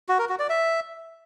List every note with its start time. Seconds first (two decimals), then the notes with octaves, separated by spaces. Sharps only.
0.09 F#4
0.19 A#4
0.29 F#4
0.39 D5
0.50 E5